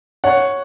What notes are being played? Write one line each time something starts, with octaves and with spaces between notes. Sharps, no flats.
C#5 F#5